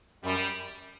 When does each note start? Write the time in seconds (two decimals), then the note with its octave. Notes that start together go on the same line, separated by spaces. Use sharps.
0.24 F#2 G3